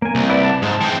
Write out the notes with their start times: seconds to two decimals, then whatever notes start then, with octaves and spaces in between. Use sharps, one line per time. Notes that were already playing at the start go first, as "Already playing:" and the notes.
0.02 A#3 G#5
0.15 C2
0.29 E4 B4 D5
0.44 A5
0.62 G#2 G#3 A5
0.81 E3 C4